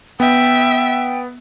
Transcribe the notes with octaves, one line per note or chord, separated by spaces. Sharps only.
B3 E5 G5